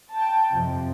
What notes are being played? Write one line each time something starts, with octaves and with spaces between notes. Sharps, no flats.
G5 A5
F2 C3 F3